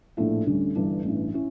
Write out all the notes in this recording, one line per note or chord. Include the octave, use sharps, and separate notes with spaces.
A#1 A2 F3 A3 E4
D2 D3 G3 C#4
G1 G2 E3 G3 D4
A1 G2 E3
C#4 E4